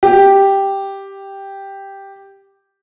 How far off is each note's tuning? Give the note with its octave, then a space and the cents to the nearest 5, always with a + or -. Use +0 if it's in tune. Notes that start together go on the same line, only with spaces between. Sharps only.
G4 +0